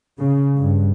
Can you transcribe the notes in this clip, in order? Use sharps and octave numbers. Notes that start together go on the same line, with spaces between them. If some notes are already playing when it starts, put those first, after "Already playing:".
C#3
G2